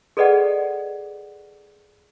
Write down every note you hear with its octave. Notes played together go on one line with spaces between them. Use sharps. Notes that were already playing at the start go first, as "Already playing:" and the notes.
G#4 A4 B4 D5 D#5 F#5